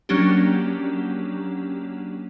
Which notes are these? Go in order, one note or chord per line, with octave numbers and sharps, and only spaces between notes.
F#3 A#3 C#4 D4 G4